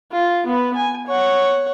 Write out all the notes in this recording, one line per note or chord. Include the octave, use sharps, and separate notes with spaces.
F4
B3 B4
G#5
C#5 F#5